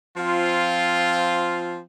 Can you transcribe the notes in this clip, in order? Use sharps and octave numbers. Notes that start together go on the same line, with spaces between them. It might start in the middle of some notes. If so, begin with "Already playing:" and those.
F3 C4 F4